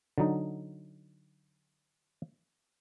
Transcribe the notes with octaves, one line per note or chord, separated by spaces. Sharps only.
D3 F#3 D#4